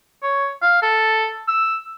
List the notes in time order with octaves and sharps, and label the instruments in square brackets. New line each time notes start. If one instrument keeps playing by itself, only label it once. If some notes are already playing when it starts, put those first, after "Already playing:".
[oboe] C#5
F5
A4
E6